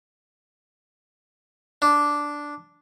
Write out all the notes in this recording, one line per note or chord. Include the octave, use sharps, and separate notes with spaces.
D4